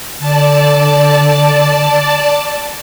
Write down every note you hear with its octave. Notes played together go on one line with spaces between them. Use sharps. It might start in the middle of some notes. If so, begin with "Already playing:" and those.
D3 D5 A5